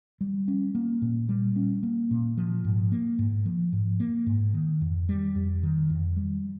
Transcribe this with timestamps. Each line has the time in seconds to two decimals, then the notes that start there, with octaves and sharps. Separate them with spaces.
0.21 G3
0.48 C#4
0.75 A#3
1.02 A#2
1.29 G3
1.56 C#4
1.83 A#3
2.11 A#2
2.37 F3
2.64 G#2
2.92 A#3
3.19 G#2
3.45 F3
3.73 G#2
4.00 A#3
4.26 G#2
4.54 D#3
4.81 F2
5.09 G3
5.35 F2
5.63 D#3
5.90 F2
6.16 G3